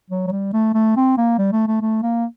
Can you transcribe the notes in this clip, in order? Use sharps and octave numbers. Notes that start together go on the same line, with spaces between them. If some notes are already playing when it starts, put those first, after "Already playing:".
F#3
F#3
G3
A3
A3
C4
A#3
G3
A3
A3
A3
A#3